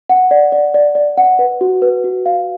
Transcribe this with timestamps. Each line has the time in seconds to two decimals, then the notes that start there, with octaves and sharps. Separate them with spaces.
0.09 F#5
0.31 D5
0.52 D5
0.74 D5
0.95 D5
1.17 F#5
1.39 B4
1.61 F#4
1.82 B4
2.04 F#4
2.26 F5